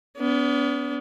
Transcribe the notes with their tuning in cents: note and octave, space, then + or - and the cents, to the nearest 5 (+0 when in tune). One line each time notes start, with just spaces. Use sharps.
B3 +10 D4 -45